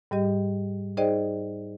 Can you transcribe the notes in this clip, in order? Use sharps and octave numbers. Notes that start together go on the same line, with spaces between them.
G#2 G3 G4 D#5
D#4 G#4 C5 D5 D#5 G5